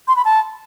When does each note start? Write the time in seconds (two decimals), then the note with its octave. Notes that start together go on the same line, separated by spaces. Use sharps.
0.08 C6
0.16 B5
0.25 A5